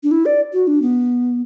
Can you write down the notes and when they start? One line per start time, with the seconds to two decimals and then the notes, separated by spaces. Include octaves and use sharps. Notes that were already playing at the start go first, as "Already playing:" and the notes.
0.03 D4
0.11 E4
0.26 D5
0.53 F#4
0.67 D4
0.82 B3